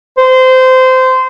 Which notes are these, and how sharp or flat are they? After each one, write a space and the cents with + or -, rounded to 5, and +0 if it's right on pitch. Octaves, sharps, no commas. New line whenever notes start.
C5 -20